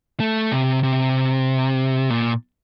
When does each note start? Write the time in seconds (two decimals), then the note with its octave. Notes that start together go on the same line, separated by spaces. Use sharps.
0.20 A3
0.51 C3
0.83 C3
2.10 A#2